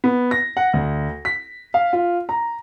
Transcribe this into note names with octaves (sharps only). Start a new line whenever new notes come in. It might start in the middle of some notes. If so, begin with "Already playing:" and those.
B3
A#6
F#5
D2
B6
F5
F4
A#5